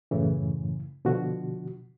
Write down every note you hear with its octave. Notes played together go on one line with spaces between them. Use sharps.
F#2 A2 C#3 E3
B2 D3 F3 F#4